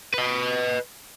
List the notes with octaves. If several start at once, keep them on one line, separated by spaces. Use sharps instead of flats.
B4 D#5